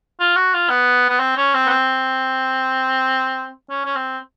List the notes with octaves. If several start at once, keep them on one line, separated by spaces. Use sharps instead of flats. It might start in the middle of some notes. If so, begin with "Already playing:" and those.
F4
F#4
F4
B3
B3
C4
C#4
C4
B3
C4
C#4
C#4
C4